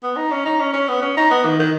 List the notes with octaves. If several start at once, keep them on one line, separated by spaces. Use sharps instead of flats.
B3
D#4
C#4
D#4
C#4
C#4
B3
C#4
D#4
B3
D#3
D#3